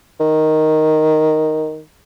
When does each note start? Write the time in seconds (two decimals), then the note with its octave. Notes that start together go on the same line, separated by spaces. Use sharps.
0.20 D#3